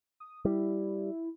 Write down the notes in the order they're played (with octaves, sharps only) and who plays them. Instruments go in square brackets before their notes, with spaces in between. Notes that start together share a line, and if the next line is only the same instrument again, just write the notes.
[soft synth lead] D#6
[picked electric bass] G3 [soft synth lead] E4